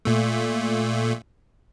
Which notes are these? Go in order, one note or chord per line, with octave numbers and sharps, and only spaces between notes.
A#2 A3